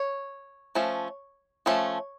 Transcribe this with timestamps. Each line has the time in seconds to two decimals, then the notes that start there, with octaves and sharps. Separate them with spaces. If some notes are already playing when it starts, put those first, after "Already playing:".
Already playing: C#5
0.75 F3 A3 C#4
1.66 F3 A3 C#4